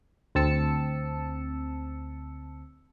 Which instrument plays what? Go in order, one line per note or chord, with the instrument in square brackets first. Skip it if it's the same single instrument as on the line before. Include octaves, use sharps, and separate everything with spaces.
[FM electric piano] D2 C4 A5 E6 C#7